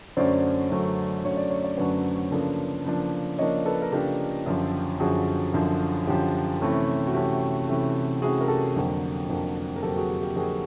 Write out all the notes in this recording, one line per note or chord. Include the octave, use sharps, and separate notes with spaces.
F#2 D3 F#3 A3 C#4 C5 D5
F#2 D3 F#3 A3 C#4
F#2 D3 F#3 A3 C#4 C#5
D5
C#5
D5
F#2 D3 F#3 A3 C#4 B4 C#5
C#3 F3 A#3 D4 A4 B4
C#3 F3 A#3 D4
C#3 F3 A#3 D4 C#5 D#5
A4 B4
A#4
C#3 F3 A#3 D4 G4 A4
F#2 D3 F3
F#2 D3 F3 F#4 G#4
F#2 D3 F3
F#2 D3 F3 G4
C3 E3 A3 C#4
F#4
C3 E3 A3 C#4 G4
C3 E3 A3 C#4
C3 E3 A3 C#4 F#4 G#4
A#4
G4 A4
F2 D3 F#3 A#3
F2 D3 F#3 A#3
A#4
F2 D3 F#3 A#3 G4 A4
F#4 G#4
G4
G4
F2 D3 F#3 A#3 F#4 G#4